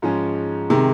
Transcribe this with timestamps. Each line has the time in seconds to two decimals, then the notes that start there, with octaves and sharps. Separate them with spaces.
0.02 G#2 F3 G#3 C#4
0.70 C3 D#3 G#3